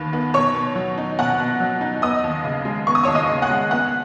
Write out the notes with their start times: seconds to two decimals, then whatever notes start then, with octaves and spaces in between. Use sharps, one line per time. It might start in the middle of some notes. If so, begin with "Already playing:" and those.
Already playing: D#2 D#3 B4
0.13 B3
0.34 B2 C#5 C#6
0.54 B2
0.76 F#3
0.98 D#4
1.19 B2 F#5 F#6
1.40 B2
1.60 F#3
1.81 D#4
2.02 B3 D#5 D#6
2.24 D#2
2.44 C#3
2.65 G#3
2.87 B3 C#6
2.95 D#6
3.03 D#2 C#5 C#6
3.15 D#5 D#6
3.29 C#3
3.42 F#5 F#6
3.50 G#3
3.71 B3 F#5 F#6